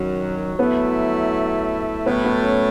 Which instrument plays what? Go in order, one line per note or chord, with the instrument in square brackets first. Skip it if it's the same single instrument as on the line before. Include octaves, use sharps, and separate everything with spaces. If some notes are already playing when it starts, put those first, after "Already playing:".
Already playing: [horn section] F#2 D#3 F#3
[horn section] F#3 A3 E4 [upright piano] B3
[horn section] A2 F#3 A3 [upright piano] B3
[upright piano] B3
C#4